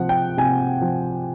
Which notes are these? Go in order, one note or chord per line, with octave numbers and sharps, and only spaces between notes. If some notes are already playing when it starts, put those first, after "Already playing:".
Already playing: C3 F3 F#5
G5
C3 G#5
F3